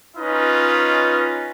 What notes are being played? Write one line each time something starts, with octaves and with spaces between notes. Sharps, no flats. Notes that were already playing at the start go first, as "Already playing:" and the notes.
C#4 D#4 F4 B4 D#5